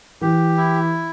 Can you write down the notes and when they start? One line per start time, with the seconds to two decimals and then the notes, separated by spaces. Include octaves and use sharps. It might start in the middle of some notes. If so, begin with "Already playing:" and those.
0.22 E3 G4
0.57 E4